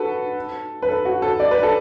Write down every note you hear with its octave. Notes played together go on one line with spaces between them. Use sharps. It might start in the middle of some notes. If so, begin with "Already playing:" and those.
Already playing: F#4 A4 B4
B4
A4
F#4
A4
D5
B4
A4